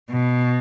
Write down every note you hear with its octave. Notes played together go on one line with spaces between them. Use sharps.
B2